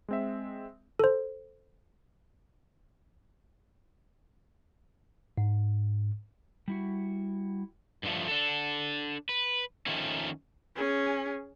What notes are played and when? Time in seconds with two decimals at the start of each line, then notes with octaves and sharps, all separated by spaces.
0.08 G#3 C4 E5
0.99 A4 C5
5.38 G#2
6.68 G3 E4 F#4
8.03 G2 D3 D#3 F3 A3
8.28 D4 A4
9.29 B4
9.86 D#3 F3 A3 A#3 C#4
10.75 C#4 G#4